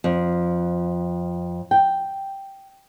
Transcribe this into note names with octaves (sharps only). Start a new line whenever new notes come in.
F2
G5